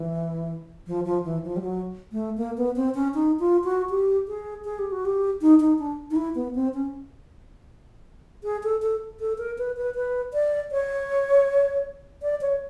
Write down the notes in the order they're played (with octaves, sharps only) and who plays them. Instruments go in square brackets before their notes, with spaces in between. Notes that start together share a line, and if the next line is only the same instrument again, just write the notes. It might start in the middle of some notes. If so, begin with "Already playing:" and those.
Already playing: [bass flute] E3
F3
F3
E3
F3
G3
F#3
A3
A#3
B3
C4
C#4
D#4
F4
F#4
G4
G#4
G#4
G4
F#4
G4
D#4
D#4
D4
D#4
E4
B3
C4
C#4
G#4
A4
A4
A4
A#4
B4
B4
B4
D5
C#5
D5
C#5